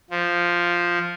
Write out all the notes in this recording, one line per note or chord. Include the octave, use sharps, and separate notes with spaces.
F3